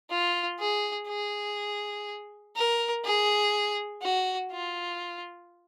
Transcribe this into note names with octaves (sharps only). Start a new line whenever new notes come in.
F4
G#4
G#4
A#4
G#4
F#4
F4